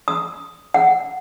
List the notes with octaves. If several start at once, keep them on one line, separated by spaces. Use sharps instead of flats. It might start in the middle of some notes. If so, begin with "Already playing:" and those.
D#6
F#5